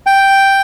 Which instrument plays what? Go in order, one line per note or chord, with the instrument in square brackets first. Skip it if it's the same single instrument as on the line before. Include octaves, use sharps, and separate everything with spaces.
[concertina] G5